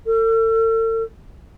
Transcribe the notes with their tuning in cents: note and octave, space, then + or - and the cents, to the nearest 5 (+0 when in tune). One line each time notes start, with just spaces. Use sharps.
A4 +40